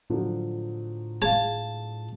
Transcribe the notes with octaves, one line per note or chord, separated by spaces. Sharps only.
A2 D3 F3 F#3
G#4 F5 A5